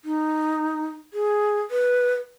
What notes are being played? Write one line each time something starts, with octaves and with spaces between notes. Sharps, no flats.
D#4
G#4
B4